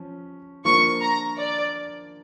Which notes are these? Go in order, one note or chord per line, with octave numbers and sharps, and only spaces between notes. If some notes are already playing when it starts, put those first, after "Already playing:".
Already playing: F3 C#4
F3 A#3 D4 F4 A#4 C#6
A#5
D5